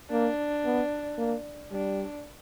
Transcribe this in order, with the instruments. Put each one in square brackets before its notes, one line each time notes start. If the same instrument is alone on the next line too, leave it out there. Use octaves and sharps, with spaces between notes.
[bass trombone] A#3 [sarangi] D4
[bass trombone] B3
A#3
[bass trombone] G3 [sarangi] D4